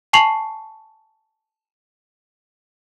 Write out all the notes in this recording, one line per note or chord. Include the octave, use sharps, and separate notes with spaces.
G#5 A5 C#6 C7 F7 F#7